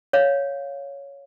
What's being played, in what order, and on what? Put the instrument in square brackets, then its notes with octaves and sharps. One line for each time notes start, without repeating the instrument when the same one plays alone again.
[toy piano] C#5 F5